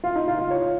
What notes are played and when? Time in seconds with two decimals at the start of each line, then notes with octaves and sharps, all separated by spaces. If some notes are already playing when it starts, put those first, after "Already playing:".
0.04 F4
0.15 D#4
0.28 F4
0.39 F4
0.51 C#5